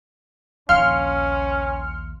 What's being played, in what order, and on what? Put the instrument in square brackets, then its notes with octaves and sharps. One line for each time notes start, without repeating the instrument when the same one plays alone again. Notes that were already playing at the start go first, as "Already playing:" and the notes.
[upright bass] A#1 D#2 [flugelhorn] C#4 [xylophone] F5 [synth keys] C6 F6 C#7